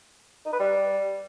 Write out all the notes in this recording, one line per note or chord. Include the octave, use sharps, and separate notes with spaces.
D#4
B4
G3